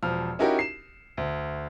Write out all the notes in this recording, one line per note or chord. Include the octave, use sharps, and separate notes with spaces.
E1 F3 F6
C#4 D#4 E4 F#4 G4 A#4
C7 E7
D2